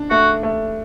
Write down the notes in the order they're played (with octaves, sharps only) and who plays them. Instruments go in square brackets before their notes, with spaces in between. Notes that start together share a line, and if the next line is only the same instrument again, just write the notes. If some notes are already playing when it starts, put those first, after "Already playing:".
Already playing: [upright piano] D4
[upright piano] A3 [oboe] F#4
[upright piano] A3